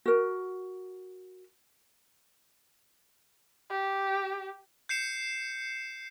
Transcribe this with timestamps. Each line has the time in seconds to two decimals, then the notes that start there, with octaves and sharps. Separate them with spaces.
0.06 F#4 A#4
3.70 G4
4.89 G6 C7 C#7 E7